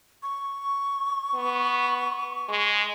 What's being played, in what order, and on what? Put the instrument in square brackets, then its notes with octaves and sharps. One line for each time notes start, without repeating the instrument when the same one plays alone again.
[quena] C#6
[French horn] B3
G#3